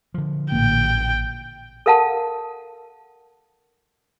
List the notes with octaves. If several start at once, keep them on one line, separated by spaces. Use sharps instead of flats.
D3 F3
A1 A#2 G5
A4 A#4 F5 F#5 A5